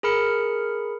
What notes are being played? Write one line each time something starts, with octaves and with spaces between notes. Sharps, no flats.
G#4 A#4 B5 F6 C#7